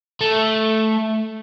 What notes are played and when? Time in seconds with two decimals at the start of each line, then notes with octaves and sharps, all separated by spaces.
0.21 A3